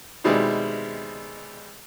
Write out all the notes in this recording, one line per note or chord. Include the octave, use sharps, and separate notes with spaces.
B2 D#3 G3 G#3 C4 E4